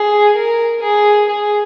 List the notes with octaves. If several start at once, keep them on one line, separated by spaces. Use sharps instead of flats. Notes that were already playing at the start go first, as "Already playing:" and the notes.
Already playing: G#4
A#4
G#4
G#4